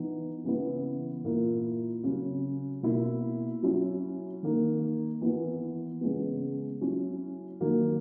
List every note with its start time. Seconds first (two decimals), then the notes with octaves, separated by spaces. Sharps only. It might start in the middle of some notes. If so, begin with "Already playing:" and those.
Already playing: E3 B3 D#4
0.44 C#3 E3 B3 E4
1.24 A#2 A#3 E4
2.03 C#3 F#3 C#4
2.83 B2 A#3 E4
3.63 F#3 C#4 E4
4.43 D#3 A#3 D#4
5.21 E3 B3 E4
6.01 C#3 G#3 B3
6.81 F#3 C#4 E4
7.61 D#3 F#3 A#3